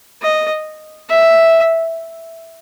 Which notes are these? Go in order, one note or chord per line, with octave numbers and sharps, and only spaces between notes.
D#5
E5